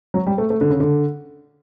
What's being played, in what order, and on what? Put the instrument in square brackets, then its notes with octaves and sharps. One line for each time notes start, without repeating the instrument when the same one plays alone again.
[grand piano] F#3
G3
A3
A3
D3
C#3
D3